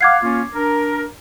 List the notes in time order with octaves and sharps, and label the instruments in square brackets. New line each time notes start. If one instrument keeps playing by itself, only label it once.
[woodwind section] F5 F#5 [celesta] D6 G#6 C7
[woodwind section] A#3 C#4 F4
D4 A#4